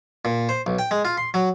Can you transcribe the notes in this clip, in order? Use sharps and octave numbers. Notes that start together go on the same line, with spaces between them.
A#2
C5
B1
G5
G#3
F4
C6
F#3